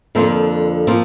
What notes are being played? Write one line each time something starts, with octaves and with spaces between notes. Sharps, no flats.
F2 D3 F3 A#3 C4
F3 A#3 C4